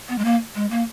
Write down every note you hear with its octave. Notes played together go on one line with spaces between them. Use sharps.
B3
G#3
A#3
G#3
A#3